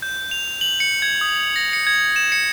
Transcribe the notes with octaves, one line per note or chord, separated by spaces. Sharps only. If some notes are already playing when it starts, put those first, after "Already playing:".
G6
F7
F#7
C#7
G#6
D#6
A#6
C#7
G#6
E7
C#7